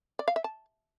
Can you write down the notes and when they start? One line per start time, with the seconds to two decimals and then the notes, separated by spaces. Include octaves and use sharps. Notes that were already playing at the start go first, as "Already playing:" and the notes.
0.19 D5
0.28 F5
0.36 E5
0.44 A5